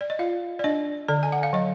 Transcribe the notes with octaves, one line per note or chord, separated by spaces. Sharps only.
D5
D#5
F4 F5
D5
D4 D#5
D3 D5
G#5
F#5
F5
F#3 D#5